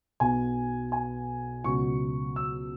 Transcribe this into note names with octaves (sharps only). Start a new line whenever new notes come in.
B1 B2 B3 G#5
G#5
C#2 B2 F#3 C#6
E6